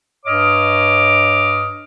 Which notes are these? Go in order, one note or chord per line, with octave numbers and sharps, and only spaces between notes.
G2 C#5 D#5 D6 F6